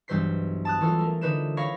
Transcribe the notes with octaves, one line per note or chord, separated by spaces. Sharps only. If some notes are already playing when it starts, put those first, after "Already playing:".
B1 G2 E3 C5 B6 C7
A5 D#6 F#6
E3 C#4 F4 A4 F6
A3 A#4
D3 D#4 B4 C5 E7
C#5 F5 B5 C#6 A#6